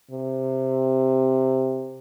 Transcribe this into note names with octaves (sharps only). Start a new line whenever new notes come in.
C3